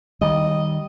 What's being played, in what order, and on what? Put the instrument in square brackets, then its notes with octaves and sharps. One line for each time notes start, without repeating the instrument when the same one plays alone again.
[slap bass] D#3 G3 [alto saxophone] D#5